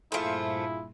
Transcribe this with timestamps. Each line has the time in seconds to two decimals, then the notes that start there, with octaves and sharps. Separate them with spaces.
0.12 G2 A#2 F3 A3 E4 F4 G#4 C6